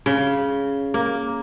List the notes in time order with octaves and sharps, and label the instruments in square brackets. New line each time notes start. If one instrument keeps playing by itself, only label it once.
[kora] C#3
A#3